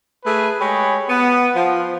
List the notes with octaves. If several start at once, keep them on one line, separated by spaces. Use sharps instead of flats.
A3 G#4 B4
G#3 G4 C#5 B5
B3
F3